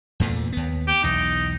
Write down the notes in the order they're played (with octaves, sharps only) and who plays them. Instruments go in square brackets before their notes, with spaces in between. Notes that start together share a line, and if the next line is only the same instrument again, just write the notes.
[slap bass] E2 A#2 A3
D#2 B3
[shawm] G4
[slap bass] B1 E2 [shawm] D#4